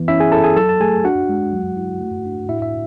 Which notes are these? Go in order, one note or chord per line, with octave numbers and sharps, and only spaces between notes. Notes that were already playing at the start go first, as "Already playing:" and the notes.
Already playing: E3 B3
C#4 E4 E5
G#4 G#5
E4 A4 A5
G#4 G#5
F#3 A4 A5
A5
A3 G#4 G#5
D4 F#4 F#5
G#3
F#3
E4
A3
D4
A2 E4 E5
E5